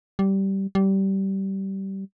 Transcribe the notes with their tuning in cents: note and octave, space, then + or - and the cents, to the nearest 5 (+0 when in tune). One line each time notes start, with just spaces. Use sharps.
G3 -15
G3 -20